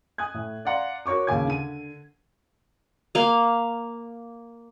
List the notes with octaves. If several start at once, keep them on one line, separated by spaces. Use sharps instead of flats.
G#5 D#6 F#6 G#6
A2
D5 F5 F#5 A#5 C6
F#4 A#4 C#5 C#6 D6
D1 D#2 C#3 G#5 D6 G#6
D3 D#7
A#3 F5